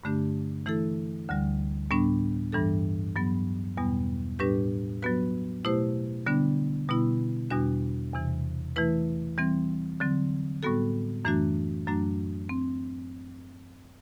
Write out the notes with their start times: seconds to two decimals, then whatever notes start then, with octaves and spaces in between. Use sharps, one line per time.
0.04 G2 D3 A3 D4 G4
0.66 E3 A3 E4 A4
1.29 D2 D3 G3
1.91 A2 G3 B3 D4
2.52 G2 E3 G3 D4 A4
3.16 G2 F#3 B3
3.77 E2 B2 G3 B3
4.39 A2 G3 D4 G4 B4
5.02 F#3 B3 F#4 B4
5.65 B2 A3 E4 G4 C5
6.26 D3 G3 B3 D4
6.89 B2 G3 B3 E4
7.50 E2 B2 G3 D4 F#4
8.13 E2 C3 E3
8.76 E3 A3 E4 B4
9.38 E3 G3 C4
10.00 D3 F#3 C4
10.63 A2 G3 B3 F#4 A4
11.25 F#2 E3 A3 D4 F#4
11.87 F#2 F#3 A3 D4 F#4
12.49 C4